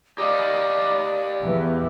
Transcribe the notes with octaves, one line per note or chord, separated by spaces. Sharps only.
G4 D5 D#5 F5
E2 E3 B3